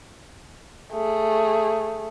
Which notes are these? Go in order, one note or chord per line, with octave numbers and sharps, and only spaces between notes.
A3 G#4